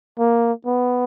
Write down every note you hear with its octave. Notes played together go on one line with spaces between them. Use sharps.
A#3
B3